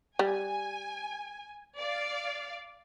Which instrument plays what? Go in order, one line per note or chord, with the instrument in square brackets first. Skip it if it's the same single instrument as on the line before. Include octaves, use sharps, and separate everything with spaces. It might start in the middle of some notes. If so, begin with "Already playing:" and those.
[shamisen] G3 [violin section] G#5
[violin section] D5 F5